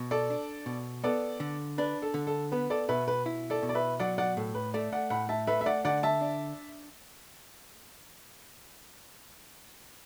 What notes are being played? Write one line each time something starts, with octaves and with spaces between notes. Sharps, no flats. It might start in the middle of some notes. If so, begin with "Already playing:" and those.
Already playing: B2
A4 D5
D4
B2
B3 A4 D5
D3
D4 B4
A4
D3
A4
B3 B4
A4 D5
B2 B4 E5
B4
E4
A4 D5
B2
D5
B4 E5
F#3 D5 F#5
D5 F#5
A2 A4
B4
A3 A4 D5
D5 F#5
A2 F#5 B5
E5 A5
A3 B4 E5
E5
D5 F#5
D3 D5 F#5
E5 A5
D4